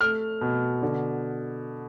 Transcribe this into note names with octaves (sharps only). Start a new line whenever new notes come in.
A3 F6
B2
D3